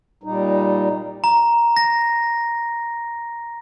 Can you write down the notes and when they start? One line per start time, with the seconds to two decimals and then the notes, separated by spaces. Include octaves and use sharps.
0.23 A#2 G3 D#4
1.24 A#5
1.77 A#6